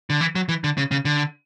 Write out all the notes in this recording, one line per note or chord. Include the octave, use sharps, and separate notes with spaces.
D3
E3
F#3
E3
D3
C#3
C#3
D3